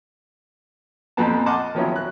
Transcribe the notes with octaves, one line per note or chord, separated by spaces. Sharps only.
F2 A#2 B3 C4 A5
D#5 F#5 A5 C6 D6 F6
D#3 F3 F#3 B3 C#4 E4
C#4 F#6